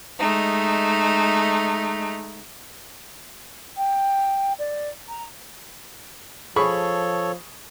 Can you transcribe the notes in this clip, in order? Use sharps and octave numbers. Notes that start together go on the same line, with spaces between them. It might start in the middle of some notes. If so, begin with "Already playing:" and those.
G#3 A3 D#4
G5
D5
A#5
F3 G#4 A4 C#5 B5 C#6